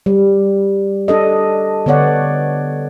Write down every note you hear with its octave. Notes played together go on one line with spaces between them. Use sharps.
G3
D4 A4 D#5
D3 B3 C#5 D5 F#5